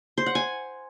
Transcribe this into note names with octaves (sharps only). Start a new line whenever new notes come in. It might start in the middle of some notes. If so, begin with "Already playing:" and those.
C5
F#5
G#5